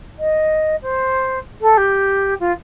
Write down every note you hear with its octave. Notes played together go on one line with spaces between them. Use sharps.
D#5
C5
A4
G4
F4